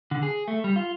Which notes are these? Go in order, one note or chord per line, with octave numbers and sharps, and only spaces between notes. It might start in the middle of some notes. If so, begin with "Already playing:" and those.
D3
G#4
A3
G3
F4